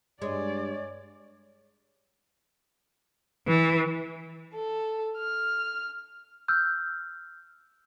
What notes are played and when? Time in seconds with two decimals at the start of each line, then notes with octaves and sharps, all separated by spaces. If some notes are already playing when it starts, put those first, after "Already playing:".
0.22 G2 G#3 C#5 D5
3.48 E3
4.54 A4
5.18 F6
6.48 E6 F6 G6